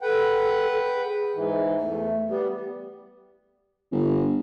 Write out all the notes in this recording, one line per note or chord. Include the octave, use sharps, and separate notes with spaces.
A4 B4 F#5 G5
G#4
G#2 E3
E2 A3
G3 B3 G4
G1